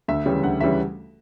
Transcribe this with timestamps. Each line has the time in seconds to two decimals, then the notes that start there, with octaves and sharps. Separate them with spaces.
0.08 D2 E5
0.26 C#3 E3 G3 C#4
0.43 D2 F#5
0.61 C#3 E3 G3 C#4 E5